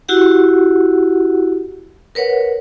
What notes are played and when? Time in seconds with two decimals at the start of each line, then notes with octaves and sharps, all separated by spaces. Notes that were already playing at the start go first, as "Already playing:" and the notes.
0.09 E4 F#4 G4 F#5
2.15 A#4 B4 C#5 F#5